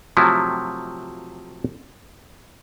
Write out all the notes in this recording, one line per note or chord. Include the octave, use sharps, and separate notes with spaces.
C3 F3 F#3 A3 E4